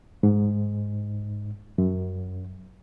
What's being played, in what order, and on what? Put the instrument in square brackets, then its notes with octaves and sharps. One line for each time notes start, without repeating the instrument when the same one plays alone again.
[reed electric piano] G#2
F#2